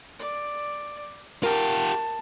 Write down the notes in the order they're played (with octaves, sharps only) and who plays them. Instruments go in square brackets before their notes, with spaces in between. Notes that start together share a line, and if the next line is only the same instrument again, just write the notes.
[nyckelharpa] D5
[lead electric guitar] F4 G4 [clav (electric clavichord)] A#4 [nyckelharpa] A5